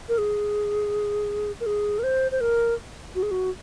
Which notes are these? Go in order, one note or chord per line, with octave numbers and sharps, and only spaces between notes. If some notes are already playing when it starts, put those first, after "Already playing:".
A#4
G#4
A#4
G#4
A#4
C5
C5
A#4
F#4
G#4
F#4